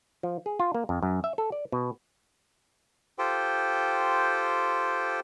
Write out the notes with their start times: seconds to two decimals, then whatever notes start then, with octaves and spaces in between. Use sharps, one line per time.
0.23 F3
0.46 G#4
0.60 F4
0.74 A#3
0.89 F2
1.03 F#2
1.24 E5
1.38 A4
1.52 D5
1.72 B2
3.19 F4 G4 A4 C5 G5